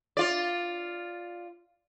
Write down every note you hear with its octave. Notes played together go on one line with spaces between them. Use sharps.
F4 D5